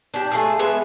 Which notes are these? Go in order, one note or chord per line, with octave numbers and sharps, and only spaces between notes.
D4 G4
A3 F4 G#4
G#3 B3 E5 G#5